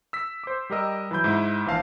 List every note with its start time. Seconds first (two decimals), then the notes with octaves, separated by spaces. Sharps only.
0.13 E6 B6
0.44 C5 D6
0.70 G3 G4 A#4 D#5 E6
1.11 E3 F#3 B5 G6
1.24 G#2 E4
1.66 A#1 E3 F5 A5